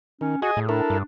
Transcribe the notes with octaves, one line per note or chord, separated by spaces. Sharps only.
D#3 C#4
F#4 G#4 D#5 G#5
A2 G#4
D4 E4 A4 A#4
G2